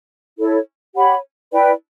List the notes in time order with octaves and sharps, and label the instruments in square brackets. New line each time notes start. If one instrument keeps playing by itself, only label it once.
[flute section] E4 A4 C#5
G4 C#5 F#5 B5
E4 B4 D5 G5